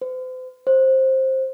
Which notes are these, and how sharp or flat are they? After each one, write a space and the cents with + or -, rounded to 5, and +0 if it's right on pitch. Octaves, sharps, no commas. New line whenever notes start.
C5 -40
C5 +15